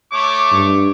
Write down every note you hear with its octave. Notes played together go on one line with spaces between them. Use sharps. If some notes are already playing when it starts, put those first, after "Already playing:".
A3 C#5 D6
G2